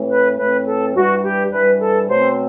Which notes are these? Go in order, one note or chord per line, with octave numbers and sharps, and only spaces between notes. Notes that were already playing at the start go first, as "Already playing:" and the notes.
Already playing: A2 E3 A3 C4
B4
A2 E3 A3 C4 B4
A4
G2 E3 G3 F#4
G4
G2 E3 G3 B4
A4
B2 F#3 A3 C4 C5